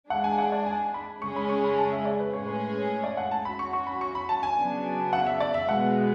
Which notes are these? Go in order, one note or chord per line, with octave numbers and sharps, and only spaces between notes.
G#3 D4 G#4 F#5
G#5
F#5
D5
G#5
B5
C#3 G#3 C#4 G#4 C#6
B5
C#6
B5
A5
E5
D5
B4
A2 G#3 C#4 G#4 C#5
B4
D5
F#5
A5
F#3 C#4 F#4 B5
C#6
C#6
B5
C#6
B5
A5
G#5
C#3 F#3 B3 D4
F#5
E5
D5
E5
B2 G#3 B3 F#5